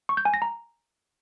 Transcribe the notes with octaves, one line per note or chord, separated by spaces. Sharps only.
C#6
G6
G#5
A#6
A#5